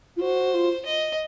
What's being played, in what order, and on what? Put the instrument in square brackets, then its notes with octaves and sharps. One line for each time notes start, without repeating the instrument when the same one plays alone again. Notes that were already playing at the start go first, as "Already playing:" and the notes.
[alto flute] F4
[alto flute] F#4 [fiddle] C5
[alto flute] F4
[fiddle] D#5